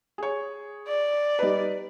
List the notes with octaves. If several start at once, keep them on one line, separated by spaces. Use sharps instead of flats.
G#4 C#5
D5
G3 D#4 B4